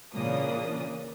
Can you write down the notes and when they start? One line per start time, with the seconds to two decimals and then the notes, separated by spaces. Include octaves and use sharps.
0.14 A#2 C#3 E3 A#3 D4 D#6